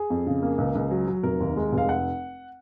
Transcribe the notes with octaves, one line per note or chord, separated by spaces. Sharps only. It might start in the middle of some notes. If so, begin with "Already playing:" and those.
Already playing: G#4
F2
C#3
A#3
C#2
C#2
F#3
F#3
F1 A#4
D#2
G#3
F1
F5
F#5